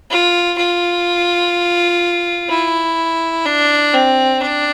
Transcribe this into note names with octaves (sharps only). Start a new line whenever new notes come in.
F4
F4
E4
D4
C4
D4